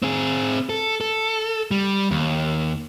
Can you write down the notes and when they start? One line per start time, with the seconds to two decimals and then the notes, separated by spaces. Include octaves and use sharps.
0.02 C4 G#4
0.69 A4
1.01 A4
1.71 G3
2.11 D#2